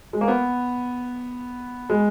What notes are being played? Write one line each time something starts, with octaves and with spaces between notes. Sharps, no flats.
G#3
A#3
B3
G#3